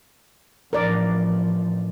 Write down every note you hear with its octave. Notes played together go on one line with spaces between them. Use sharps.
A1 F3 A#4 D5